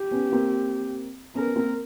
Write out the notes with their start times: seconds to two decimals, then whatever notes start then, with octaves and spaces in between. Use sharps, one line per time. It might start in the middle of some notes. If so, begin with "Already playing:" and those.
Already playing: G4
0.11 B3 C#4
0.32 A#3 C4
1.35 B3 C#4 A#4
1.56 A#3 C4